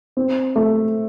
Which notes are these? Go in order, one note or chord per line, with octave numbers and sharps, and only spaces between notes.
C4
A3